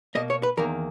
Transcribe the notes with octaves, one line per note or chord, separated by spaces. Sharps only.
B2 A#3 D#5
C#5
B4
E2 D#3 A#3 A#4